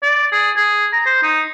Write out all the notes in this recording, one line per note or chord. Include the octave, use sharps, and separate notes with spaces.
D5
G#4
G#4
A#5
C5
D#4